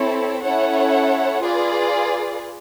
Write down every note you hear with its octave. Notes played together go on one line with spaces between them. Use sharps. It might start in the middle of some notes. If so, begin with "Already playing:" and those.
Already playing: C4 E4 A4 C#5
C#4 E4 A4 C#5 F#5
F4 G#4 B4 D5